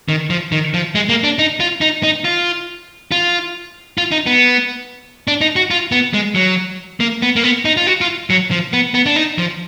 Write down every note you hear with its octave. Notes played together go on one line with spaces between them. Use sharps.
D#3
F3
D#3
F3
G#3
A#3
D4
D#4
F4
D#4
D#4
F4
F4
F4
D#4
B3
D4
D#4
F#4
F4
B3
G#3
F#3
A#3
B3
A#3
B3
D#4
F4
F#4
F4
F#3
F3
B3
B3
D4
D#4
F3